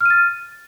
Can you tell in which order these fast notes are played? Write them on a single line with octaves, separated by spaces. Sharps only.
F6 D#7 A6